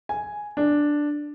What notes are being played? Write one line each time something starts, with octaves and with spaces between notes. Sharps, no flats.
G#5
D4